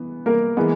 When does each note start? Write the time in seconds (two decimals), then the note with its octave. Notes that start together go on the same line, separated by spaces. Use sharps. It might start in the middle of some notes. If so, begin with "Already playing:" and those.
Already playing: E3 B3
0.26 A#3 A#4
0.57 E3 G#3 B3